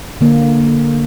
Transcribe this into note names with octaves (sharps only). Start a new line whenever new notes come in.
D3 A#3